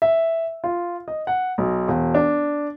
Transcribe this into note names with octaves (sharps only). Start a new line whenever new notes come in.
E5
F4
D#5
F#5
B1
E1
D4